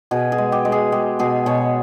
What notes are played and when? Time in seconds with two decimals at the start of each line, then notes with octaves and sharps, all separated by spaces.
0.11 B2 G#4
0.32 G#4
0.38 G#3
0.52 G4
0.65 G#3
0.72 G#4
0.92 G#3 G4
1.19 B2 G#4
1.46 B2 C#5